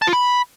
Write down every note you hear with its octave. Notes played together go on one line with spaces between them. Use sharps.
A5
F4
B5